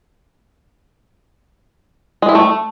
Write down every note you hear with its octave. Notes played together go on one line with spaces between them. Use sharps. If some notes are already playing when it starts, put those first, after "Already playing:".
G#3
E4
A3